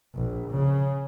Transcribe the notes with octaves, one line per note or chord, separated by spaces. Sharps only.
A#1
C#3